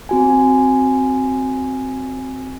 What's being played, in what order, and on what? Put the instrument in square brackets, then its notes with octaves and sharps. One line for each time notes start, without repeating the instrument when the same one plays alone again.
[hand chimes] C4 F#4 G#5